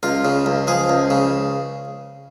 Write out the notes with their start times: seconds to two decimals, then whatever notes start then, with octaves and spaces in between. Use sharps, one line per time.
0.03 C#2 F4
0.25 C#3
0.46 C#2
0.67 F3 G#4
0.89 C#2
1.10 C#3